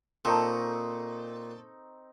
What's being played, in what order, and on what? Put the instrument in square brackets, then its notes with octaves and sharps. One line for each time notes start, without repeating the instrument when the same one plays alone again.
[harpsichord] A#2 [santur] C4 D#4 C#6 [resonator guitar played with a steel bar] A4